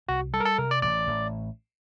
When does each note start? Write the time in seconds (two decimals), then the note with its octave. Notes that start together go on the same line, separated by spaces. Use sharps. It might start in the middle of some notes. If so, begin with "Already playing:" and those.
0.09 C2 F#4
0.33 G3 A4
0.40 A#4
0.45 A4
0.58 C3 A#4
0.71 D5
0.82 A1 D5
1.07 A1